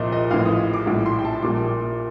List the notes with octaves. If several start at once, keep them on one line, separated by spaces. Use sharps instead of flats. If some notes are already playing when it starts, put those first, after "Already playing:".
Already playing: C2 A#2 F3 D#5
D#5
A1 A2 F3 F5
D#6
D6
A#1 A2 G3 D6
C6
G5
A5
A#1 A#2 G3 D6